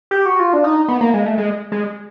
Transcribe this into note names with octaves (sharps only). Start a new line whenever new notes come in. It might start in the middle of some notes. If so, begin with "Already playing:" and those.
G4
F#4
F4
D4
D#4
B3
A#3
G#3
A3
G#3
G#3